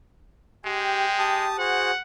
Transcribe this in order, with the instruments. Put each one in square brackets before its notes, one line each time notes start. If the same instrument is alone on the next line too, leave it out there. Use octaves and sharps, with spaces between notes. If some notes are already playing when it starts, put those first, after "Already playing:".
[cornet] G#3 [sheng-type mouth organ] G4 [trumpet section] G5
[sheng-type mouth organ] G4 A5 D#6
[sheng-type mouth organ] F#4 G#4 C5 [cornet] F#5